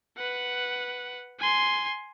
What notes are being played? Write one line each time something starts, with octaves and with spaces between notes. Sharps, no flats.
B4 F#5
G#5 C6